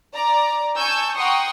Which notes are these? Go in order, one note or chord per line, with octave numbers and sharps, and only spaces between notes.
D5 A#5
G#5 A5 C#6 E6 G6
F#5 G5 A#5 C6 C#6 D#6